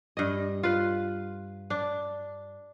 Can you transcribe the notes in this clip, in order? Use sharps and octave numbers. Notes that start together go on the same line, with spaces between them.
G2 D#5
F4 B4
D4